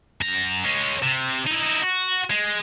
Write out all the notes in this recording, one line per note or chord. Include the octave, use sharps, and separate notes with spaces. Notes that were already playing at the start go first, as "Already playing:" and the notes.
F#2 A#5
G#3 C#4
C3
D#4 E4
F#4
G#3